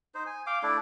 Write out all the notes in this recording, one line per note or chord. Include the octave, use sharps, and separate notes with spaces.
D#4 C5
G#5
F5 G5 D6
A3 D4 E4